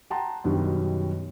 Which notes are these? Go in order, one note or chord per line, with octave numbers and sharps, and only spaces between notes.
F#5 G5 A5 A#5 C6
F#2 B2 D#3 G3